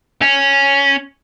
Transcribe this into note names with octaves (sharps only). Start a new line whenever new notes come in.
C#4